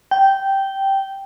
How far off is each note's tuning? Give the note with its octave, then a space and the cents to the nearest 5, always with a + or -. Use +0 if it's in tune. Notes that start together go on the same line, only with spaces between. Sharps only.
G5 -10